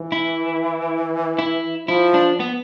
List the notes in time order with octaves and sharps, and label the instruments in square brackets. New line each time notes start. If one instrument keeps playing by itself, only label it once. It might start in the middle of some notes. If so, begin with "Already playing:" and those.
Already playing: [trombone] E3
[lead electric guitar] E4
E4
[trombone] F3 [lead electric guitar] E4
[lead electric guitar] D4
B3